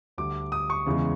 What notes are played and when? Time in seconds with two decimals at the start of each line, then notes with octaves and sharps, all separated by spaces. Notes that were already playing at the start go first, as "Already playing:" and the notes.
0.18 D2 D3 G3 D6
0.52 D#6
0.70 C#6
0.86 E2 C#3 E3 G#3